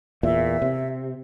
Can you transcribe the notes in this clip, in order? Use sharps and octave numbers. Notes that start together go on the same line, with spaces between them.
E2 A#2 E5
C3